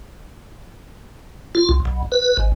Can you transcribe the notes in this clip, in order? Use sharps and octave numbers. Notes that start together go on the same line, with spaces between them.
F4
C2
B1
B4
G#1